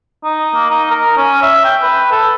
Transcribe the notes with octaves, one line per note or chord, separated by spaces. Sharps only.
D#4
A#3
D#4
A#4
C#4
E5
G5
B4
A4